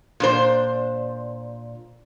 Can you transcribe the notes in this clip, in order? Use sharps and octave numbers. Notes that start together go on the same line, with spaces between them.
A#2 D4 C5